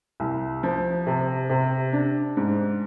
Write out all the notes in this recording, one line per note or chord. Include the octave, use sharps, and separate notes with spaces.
C2
F3
C3
C3
D4
G#2